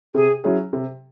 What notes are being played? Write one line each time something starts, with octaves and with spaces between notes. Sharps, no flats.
C3 G#4
F#3 C#4 E4 G#4
C3